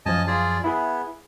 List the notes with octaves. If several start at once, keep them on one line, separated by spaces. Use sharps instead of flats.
F#2 F3 D#5 G#5 A5
F4 G#4 D5
B3 E4 G#4